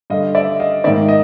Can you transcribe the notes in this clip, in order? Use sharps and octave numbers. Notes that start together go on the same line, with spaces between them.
G2 D3 D#5 F5
D5 E5
D#5 F5
G#2 D#3 D5 E5
D#5